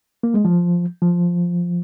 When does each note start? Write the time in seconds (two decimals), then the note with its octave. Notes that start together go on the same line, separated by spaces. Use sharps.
0.23 A#3
0.34 G#3
0.45 F3
1.02 F3